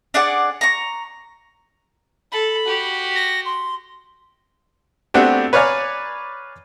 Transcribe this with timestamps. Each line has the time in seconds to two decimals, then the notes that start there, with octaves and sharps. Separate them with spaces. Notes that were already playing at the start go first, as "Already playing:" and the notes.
0.14 D4 G#4 D5 F#5
0.61 A#5 C#6
2.32 A4 B5
2.66 F#4 G4
3.15 A#6
3.45 C6
5.14 A3 B3 C4 D4 F#4 G4
5.53 B4 C#5 D5 F5 G#5 A#5